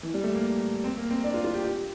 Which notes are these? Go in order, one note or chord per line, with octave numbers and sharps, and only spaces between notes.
E3
G3
A3
A#3
C4
A#3
C4
D4
F4
F4
G4
G4